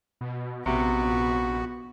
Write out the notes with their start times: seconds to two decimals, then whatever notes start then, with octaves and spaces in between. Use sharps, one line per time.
0.21 B2
0.66 A#1 C3 B3 F#4